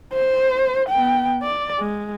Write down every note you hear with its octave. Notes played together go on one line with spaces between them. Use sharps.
C5
B3 G5
D5
G#3